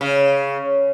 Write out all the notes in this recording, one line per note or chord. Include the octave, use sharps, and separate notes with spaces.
C#3